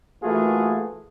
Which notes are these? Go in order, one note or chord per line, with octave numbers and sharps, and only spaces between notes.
E3 A3 A#3 F4 F#4 G#4